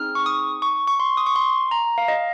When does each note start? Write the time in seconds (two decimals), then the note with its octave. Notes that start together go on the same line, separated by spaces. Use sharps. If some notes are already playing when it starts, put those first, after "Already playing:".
Already playing: C4 D#4 G#4 F6
0.15 C#6
0.26 D#6
0.62 C#6
0.87 C#6
1.00 C6
1.17 D#6
1.27 C#6
1.36 C6
1.71 A#5
1.98 F5
2.08 D#5